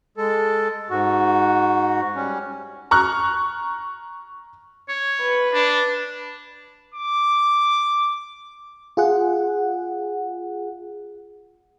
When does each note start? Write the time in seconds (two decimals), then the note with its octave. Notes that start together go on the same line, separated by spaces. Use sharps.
0.17 G#3 A4
0.90 G#2 F#4
2.15 G3 C#4
2.91 A#5 C#6 F6 F#6
4.89 C#5
5.22 B4
5.54 D4
6.94 D6
8.97 F4 G#4 F#5